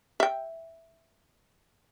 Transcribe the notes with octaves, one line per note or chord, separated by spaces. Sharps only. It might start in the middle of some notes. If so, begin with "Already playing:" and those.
E5 G5